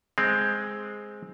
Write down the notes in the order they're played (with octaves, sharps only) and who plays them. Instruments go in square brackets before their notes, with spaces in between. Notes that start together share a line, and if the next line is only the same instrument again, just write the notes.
[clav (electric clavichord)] G#3 C4